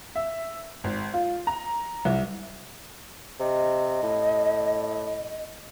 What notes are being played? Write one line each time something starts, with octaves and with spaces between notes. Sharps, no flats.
E5
G#1
F4
A#5
C2
C3 D#5
A2